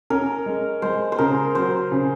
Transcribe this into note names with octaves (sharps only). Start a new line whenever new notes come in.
C#4 A#4
G#3
G#3 C5
C5
C#3 A#4
F#3 C5
C#3